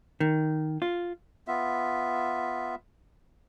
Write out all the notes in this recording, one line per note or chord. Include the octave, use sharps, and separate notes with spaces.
D#3
F4
B3 F4 E5